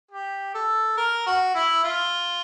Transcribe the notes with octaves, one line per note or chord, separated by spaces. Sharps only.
G4
A4
A#4
F#4
E4
F4